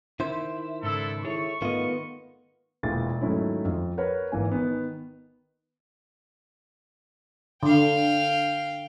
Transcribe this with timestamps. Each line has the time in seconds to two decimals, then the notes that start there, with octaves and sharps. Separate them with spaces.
0.20 D#3 E4 C5
0.83 G#2 C#3 D4 E4 A4
1.25 E4 G#4 A4 C#5 C#6
1.62 G#2 D#3 A3 B3 F4 D#5
2.83 E1 A#2 E4 A6
3.21 G#2 D#3 F#3 A3 C#4 E4
3.65 F2
3.98 A#4 B4 C#5 F#5
4.32 G#1 E3 A#3 G#5
4.52 D#3 B3
7.63 D3 F5 G5